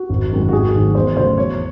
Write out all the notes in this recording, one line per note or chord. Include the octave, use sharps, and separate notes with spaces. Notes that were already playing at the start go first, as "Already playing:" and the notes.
Already playing: F#4
G#1
F#2 D#3 G#3
F#4
G#1 G#4
G#2 D#3 F#3 A3 F#4
E2 C5
C#3 F#3 A3 C5
E2 C#5